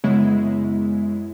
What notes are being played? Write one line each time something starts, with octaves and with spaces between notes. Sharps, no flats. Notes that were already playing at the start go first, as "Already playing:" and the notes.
F#2 C#3 G#3 B3 E4